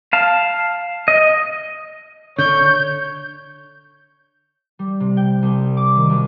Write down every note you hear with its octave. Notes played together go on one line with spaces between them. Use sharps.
F5 A5
D#5
D3 C#5 G6
G3
C3
G5
C2
D6
D#3
B1